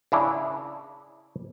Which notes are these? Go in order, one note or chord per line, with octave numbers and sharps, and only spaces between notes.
C#3 D4 E4